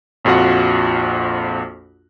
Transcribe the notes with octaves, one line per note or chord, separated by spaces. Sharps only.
A#1 F2 F4 F#4 F#5